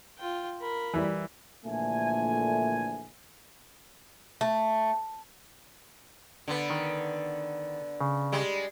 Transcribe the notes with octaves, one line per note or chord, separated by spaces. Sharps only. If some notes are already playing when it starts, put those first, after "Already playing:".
F4 G5
A#4 B5
E3 G3 E4
A#1 A#2 D3 E3 A3 G#5
A3
D3 B3
D#3
C#3
G3 G#3